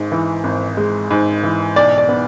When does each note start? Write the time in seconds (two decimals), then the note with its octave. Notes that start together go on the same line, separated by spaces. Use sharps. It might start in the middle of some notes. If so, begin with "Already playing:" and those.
Already playing: G#1 G#2 G#3
0.12 E3
0.44 G#1
0.77 G#3
1.11 G#2
1.43 E3
1.76 B1 D5
1.98 D5
2.09 B3